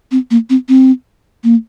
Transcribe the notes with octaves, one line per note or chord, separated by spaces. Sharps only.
C4
A#3
C4
C4
A#3